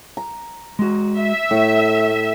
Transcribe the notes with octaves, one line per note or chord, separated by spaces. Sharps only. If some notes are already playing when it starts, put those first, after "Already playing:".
A#5
G#3 F#4
E5
A2 A3